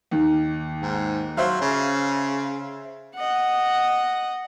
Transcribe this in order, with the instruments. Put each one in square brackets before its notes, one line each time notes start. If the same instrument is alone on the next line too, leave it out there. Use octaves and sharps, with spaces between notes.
[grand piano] D#2 D#3
[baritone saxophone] G#2
[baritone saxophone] F#3 [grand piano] C5 E5 F5
[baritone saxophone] C#3
[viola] D#5 F#5